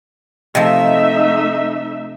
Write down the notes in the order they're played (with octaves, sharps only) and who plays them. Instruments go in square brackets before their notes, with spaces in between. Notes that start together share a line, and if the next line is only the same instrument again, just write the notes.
[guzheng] C3 F3 [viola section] A3 D#4 E5 [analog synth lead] D#5